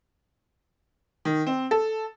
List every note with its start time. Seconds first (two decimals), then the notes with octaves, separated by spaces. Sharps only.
1.25 D#3
1.47 C4
1.71 A4